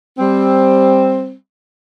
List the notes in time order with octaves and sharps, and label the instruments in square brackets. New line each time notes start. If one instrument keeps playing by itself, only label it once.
[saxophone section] G3 C4